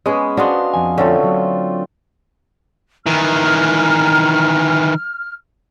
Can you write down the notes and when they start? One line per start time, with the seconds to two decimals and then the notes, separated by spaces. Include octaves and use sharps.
0.06 G#3 B3 C#4 G#4 B5
0.37 B3 D4 F#4 G#4 C5 D#5 F5 C6
0.74 F2 G#5
0.98 D3 A3 C4 C#4 F4
1.24 F#3
3.06 D#3 E3 F6